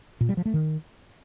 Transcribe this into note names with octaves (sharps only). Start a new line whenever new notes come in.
A#2
G3
F3
A3
D#3